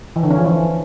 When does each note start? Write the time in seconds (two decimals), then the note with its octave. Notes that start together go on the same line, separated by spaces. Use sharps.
0.16 E3
0.23 D3
0.31 C#4
0.38 F3
0.45 E3